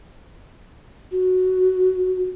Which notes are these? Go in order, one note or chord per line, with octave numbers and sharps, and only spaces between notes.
F#4